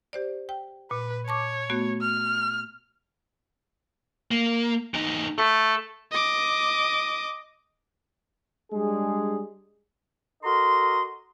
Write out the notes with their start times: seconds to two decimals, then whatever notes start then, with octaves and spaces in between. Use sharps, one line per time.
0.13 G4 C5 D5
0.49 G5
0.91 A#2 B4
1.28 C#5 A5 C#6 D6
1.70 A3 B3 F#4
2.02 F6
4.31 A#3
4.94 E2 D#4
5.38 A3 A4
6.11 D#5 D6
8.73 G3 G#3 D4 G#4
10.43 F#4 A4 A#4 D#5 A#5 C6